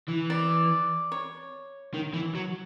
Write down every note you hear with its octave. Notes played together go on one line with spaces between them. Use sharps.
E3
D5
C#5
D#3
E3
F#3